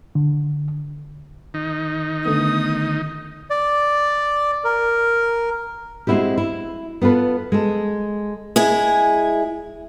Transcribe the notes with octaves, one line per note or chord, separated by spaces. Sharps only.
D3
D#3 D#4
D3 A3 B3 D#6
D5
A#4
G#3 C4 D4 E4 F#4 G4
E4
B3 F4 A4 B4
G#3 A4
G#3 E4 G#4